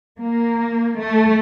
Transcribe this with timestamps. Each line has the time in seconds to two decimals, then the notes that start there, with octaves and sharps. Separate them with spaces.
0.20 A#3
1.00 A3